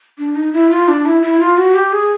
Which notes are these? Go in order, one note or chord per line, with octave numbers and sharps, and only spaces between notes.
D4
D#4
E4
F4
D4
E4
E4
F4
F#4
G4
G#4